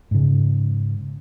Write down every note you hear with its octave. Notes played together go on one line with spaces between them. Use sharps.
G#2 C#3